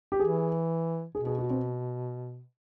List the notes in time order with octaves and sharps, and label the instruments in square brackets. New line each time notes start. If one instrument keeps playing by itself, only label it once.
[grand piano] G4
[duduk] E3 [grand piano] G#4
[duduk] B2 [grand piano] G#4
[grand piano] G#4
F#4
C4